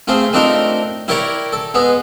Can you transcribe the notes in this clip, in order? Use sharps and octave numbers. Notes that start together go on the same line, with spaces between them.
A3 C4 F4 G#4
A3 C4 D4 D#4 F4 A#4
E4 G4 A#4 C#5 D5
A4
G#3 B3